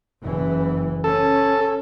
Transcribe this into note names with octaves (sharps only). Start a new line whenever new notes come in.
F#1 E3
C#4 A4